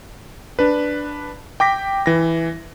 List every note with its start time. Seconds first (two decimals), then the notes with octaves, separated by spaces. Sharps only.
0.59 D4 B4
1.60 G5 D6 A#6 B6
2.06 E3 A#6